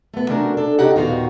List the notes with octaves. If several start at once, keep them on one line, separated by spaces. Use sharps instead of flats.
A3 B3
C3 A3 C#4 D4 F#4 A#4
D4 A4
C3 C#4 D#4 G4 G#4 F#5
D#2 A#2 D#3 B3 F#4 F5